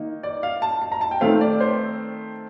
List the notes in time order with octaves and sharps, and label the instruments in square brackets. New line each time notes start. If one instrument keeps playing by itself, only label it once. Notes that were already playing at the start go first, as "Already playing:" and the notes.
Already playing: [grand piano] D#3 A#3 D#4
D5
F5
A5
A5
A#5
A5
G5
D#3 A3 C4 F5
D5
C5